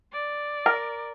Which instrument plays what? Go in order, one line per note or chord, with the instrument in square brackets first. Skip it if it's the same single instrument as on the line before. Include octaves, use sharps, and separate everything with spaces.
[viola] D5
[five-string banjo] A#4